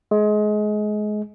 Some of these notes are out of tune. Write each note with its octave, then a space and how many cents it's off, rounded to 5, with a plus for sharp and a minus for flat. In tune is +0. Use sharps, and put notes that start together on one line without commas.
G#3 +25